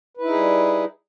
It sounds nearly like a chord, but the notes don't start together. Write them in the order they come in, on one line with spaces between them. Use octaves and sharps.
B4 E4 D#4 G#4 G3